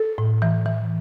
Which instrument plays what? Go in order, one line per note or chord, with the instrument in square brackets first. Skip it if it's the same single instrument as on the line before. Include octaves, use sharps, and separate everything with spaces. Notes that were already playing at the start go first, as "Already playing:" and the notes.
Already playing: [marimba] A4
A2
E3
E3